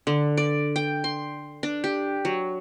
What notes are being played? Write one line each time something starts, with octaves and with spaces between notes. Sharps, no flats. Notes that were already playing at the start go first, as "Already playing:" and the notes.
D3
D5
G5
C6
D4
G4
F#3